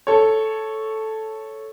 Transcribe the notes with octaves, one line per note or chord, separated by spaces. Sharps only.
A4 C#5